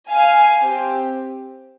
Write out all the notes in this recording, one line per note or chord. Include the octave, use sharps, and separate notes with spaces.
F5 G#5
C4 G4